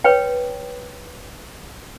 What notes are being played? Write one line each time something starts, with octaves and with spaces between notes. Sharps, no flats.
B4 C#5 G5